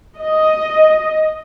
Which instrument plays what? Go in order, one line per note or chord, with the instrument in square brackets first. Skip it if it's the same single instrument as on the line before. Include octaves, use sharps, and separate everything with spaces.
[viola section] D#5